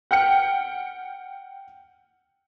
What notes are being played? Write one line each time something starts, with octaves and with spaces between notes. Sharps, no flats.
F#5 G5 F6 C#7